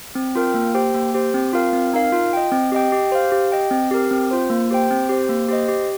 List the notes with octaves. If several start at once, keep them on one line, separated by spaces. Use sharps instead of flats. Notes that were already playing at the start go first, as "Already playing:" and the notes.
C4
F4 A#4 G5
A#3
G4 C5 G5
A#3
G4 C5
C4
F4 A#4 F5
C4
D#4 A#4 F5
F4
D#5 G5
C4
G4 D#5 G5
G4
C5 F5
G4
D#5 G5
C4
G4 A#4
C4
F4 C5
A#3
G4 C5 G5
C4
G4 C5
A#3
G4 C5 D#5
G4